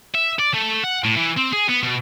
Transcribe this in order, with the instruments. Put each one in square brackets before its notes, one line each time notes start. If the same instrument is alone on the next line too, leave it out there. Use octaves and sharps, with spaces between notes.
[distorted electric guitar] E5
D5
A3
F#5
A2
E3
C4
G#4
B3
B2